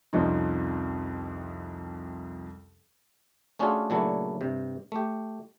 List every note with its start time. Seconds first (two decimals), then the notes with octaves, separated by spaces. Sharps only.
0.13 C2 F2 F3 C#4 D#4
3.59 A3 C#4 D4 F4 F#4 G#4
3.90 A#2 C#3 F#3 A3 D4 E4
4.41 G2 C3
4.92 A3 G4